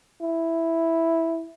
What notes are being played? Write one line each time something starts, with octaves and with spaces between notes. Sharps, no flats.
E4